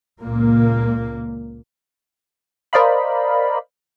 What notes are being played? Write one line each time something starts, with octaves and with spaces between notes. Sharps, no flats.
C#2 A#2 A#3
A#4 C5 D5 D#5 F5 B5